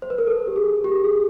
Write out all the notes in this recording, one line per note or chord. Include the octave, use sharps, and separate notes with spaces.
C5
B4
A#4
A4
G4
G#4
G4
G#4